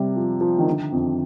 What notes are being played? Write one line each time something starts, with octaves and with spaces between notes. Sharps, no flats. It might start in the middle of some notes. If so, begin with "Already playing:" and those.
Already playing: C3 G3
F3
F3
D#3
D3
F2